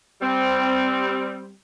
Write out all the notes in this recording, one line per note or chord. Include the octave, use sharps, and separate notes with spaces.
G3 C4